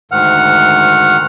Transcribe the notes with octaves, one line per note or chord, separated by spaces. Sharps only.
D2 G#2 D#3 F#5 F6